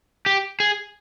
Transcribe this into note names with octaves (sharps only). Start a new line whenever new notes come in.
G4
G#4